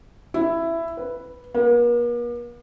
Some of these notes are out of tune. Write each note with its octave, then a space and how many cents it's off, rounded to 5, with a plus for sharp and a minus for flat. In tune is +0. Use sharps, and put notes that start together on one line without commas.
E4 +10
B4 -5
A#3 +45